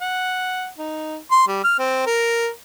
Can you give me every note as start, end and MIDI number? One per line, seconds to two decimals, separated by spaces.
0.01 0.68 78
0.79 1.17 63
1.31 1.45 84
1.48 1.63 55
1.64 1.74 89
1.79 2.05 60
2.06 2.49 70